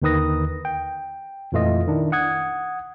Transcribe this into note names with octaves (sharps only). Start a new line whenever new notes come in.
D#2 D3 D#3 B4 D#6 A#6
G5
F2 A#2 E3 A3 F4 D#5
D#3 D4 E4
F#5 D#6 G#6